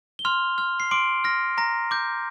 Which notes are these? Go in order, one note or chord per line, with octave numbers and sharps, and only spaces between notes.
G7
C6 F6 F7
F6
C7
C6 D6 D7
F6 A#6
A#5 A#6
D6 G6